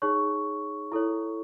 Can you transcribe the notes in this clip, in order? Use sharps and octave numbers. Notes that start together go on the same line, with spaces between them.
D#4 G#4 C#5 C#6
E4 A4 C#5